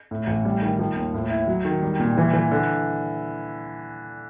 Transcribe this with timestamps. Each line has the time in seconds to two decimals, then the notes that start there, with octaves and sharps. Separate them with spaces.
0.11 A2
0.27 A1
0.45 G3
0.62 D#3
0.79 F3
0.96 D#2
1.14 A2
1.30 E4
1.47 F#3
1.65 D#3
1.82 G3
2.00 A#2
2.17 E3
2.33 E3
2.52 D3